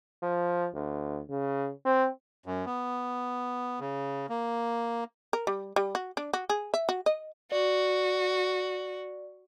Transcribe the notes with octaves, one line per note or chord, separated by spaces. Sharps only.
F3
D2
C#3
C4
F#2
B3
C#3
A#3
A#4
G3
G3
F#4
D4
F#4
G#4
E5
F#4
D#5
F#4 D5